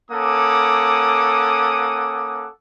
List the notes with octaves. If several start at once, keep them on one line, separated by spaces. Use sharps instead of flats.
A#3 C#4 A4 F#5 D6 D#6